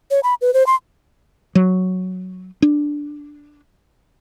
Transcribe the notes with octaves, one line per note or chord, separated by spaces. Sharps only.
C#5
B5
B4
C5
C6
F#3
D4